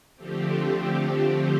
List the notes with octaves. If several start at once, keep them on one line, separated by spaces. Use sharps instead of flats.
D3 F3 A3 C4 G4